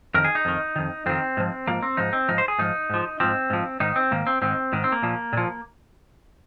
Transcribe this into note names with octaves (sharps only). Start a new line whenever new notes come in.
F2 D#3 A#4
G#4
D#4
F2 D#3
F2 D#3
F2 D#3 C4
G#2 F3
G#2 F3 A#3
C4
G#2 F3 D#4
C4
G#2 F3 D#4
C5
G#4
G#2 F3 D#4
G#2 F3
G#2 F3 C4
G#2 F3
G#2 D#3 D#4
C4
G#2 D#3 A#3
C4
G#2 D#3 C4
G#2 D#3
C4
A#3
A#2 F3
A#2 F3